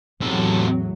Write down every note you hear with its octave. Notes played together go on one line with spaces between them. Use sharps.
E2 A2 C3 F#3 A4